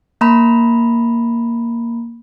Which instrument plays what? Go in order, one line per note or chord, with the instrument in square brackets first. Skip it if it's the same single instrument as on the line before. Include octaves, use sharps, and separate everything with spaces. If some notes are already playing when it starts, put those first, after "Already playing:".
[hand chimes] A#3 A#5 B5